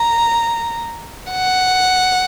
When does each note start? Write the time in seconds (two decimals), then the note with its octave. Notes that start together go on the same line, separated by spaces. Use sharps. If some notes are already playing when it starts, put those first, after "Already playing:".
Already playing: A#5
1.31 F#5